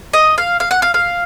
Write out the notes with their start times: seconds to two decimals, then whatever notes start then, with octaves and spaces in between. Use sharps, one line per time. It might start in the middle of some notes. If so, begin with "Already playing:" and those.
0.13 D#5
0.38 F5
0.60 F5
0.71 F#5
0.82 F5
0.94 F5